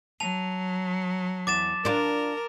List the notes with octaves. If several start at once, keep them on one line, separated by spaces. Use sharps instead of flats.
F#3 A5 F7
E2 D6 A6 E7
D4 F4 A#4